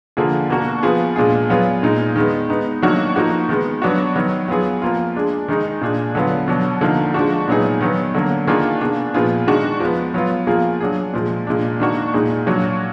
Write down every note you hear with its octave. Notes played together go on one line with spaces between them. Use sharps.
D3 F3 A#3 F4 G#4
B2 A#3 D4 F#4
F3 B3 F4 G#4
A#2 G#3 D4 F4 G#4
F#3 B3 F4 G#4
A#2 G#3 D#4
D#3 G#3 B3
G#3 B3 D#4
D#3 F#3 A#3 D4 F#4
F3 A#3 D#4 F#4
D#3 G#3 B3
F#3 B3 D4 F#4
D#3 F#3 B3
F#3 B3 F4 G#4
F3 A#3 F4
G#3 D4 G#4
D#3 G#3 D#4 G#4
A#2 G#3 D4 G#4
D3 F#3 B3 F4
B2 F#3 D4
D3 F3 A#3 D#4
F3 G#3 D4 F#4
A#2 F#3 B3 D#4 G#4
D#3 F#3 B3
D3 F#3 A#3
D#3 A#3 D4 F4 G#4
B2 A#3 D4 G#4
A#2 F3 B3 F4 G#4
D#3 G#3 D4 F#4
F3 G#3 B3
F#3 B3 F4
F3 A#3 F4 G#4
F#3 D4 G#4
A#2 F3 G#3
A#2 G#3 D4
D#3 A#3 D4 F#4
A#2 G#3 D#4 G#4
A#2 F#3 D4 F#4